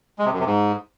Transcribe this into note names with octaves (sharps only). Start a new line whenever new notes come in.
G#3
C3
F#2
C3
G#2